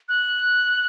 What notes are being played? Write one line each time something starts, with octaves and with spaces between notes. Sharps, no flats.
F#6